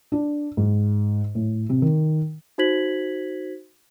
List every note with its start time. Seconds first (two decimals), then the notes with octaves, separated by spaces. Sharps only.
0.12 D4
0.57 G#2
1.35 A2
1.69 C3
1.82 D#3
2.58 D#4 F#4 C5 G#6 B6 F#7